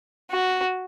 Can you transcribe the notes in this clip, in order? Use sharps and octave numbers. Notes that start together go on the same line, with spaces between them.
F#4